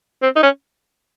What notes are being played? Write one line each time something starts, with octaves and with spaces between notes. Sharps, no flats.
C4
D#4
C#4